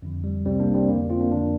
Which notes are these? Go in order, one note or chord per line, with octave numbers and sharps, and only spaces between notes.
F2 D3
G3
C2 C3 G3 C4
A#3 D4
G3 C4
F2 D3 A#3
C4 F4
A#3 D4
F2 D3 A#3 D4